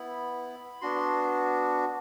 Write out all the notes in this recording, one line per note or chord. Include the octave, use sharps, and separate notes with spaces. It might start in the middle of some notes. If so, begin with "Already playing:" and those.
Already playing: B3 E4 B5
B3 D4 F#4 C6